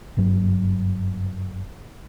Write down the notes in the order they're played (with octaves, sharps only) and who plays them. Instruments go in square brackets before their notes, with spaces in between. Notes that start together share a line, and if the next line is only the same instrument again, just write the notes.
[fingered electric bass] F#1 G2 F#3